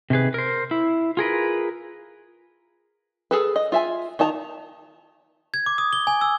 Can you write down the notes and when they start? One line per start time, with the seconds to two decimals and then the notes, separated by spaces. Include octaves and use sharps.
0.10 C3 D#3 G#4 B4
0.34 A#4 C5
0.71 E4
1.17 F4 G#4 A#4 B4
3.31 G#4 A4 B4
3.56 D#5
3.72 F4 E5 G#5
4.19 D#3 D#4 A5 A#5
5.54 G#6
5.66 D6
5.78 D#6
5.93 G7
6.07 G#5
6.21 E6